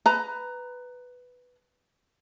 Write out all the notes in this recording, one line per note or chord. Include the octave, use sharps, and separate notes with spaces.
B4 A#5